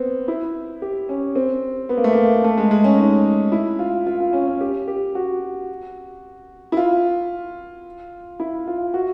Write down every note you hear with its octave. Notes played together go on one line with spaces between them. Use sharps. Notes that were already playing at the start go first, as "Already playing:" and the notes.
Already playing: B3 C4
E4
G4
C#4
C4
B3
A#3
A3
A#3
A3
G#3
G#3
C#4
D#4
E4
F4
F4
F4
C#4
C#4
G4
G4
F#4
E4
F4
E4
F4
F#4